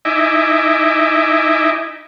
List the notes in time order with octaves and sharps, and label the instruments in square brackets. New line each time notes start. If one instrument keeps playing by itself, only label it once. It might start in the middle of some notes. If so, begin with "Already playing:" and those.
[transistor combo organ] D#4 E4 D#5 E5 G#5 D6